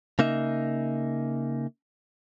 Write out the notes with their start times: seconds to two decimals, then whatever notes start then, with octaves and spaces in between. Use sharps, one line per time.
0.19 C#3 A#3 D#4 E5